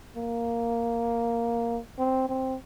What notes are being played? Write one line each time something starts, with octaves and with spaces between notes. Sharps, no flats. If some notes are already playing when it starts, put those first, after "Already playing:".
A#3
C4
C4